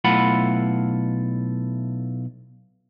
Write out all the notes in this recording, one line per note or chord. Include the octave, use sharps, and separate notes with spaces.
B1 A3 E4 F4 F#5 B5